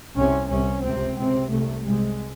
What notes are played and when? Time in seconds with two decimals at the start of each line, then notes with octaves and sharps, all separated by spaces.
0.16 C2 C3 C#4
0.49 C2 C3 C#4
0.83 C#2 C3 C4
1.17 C#2 C3 C4
1.52 C2 C3 A3
1.85 C2 C3 G#3